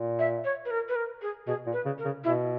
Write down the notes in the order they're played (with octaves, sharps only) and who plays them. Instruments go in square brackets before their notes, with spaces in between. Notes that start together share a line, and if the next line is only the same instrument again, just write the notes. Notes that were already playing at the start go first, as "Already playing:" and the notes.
Already playing: [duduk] A#2
[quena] E5
C#5
B4
A#4
B4
A#4
G#4
[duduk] B2 [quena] G#4
[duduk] A#2
[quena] B4
[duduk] C#3
[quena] A#4
[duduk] C#3
[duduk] B2 [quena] E4